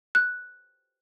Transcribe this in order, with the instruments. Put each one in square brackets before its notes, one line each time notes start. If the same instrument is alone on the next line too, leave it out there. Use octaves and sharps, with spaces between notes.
[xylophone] F#6